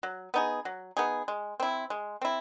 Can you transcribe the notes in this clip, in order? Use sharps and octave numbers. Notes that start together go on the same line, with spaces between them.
F#3
B3 D#4 G#4
F#3
B3 D#4 G#4
G#3
C4 E4
G#3
C4 E4